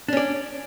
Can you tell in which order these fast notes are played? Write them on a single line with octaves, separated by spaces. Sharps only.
D4 C#4 D5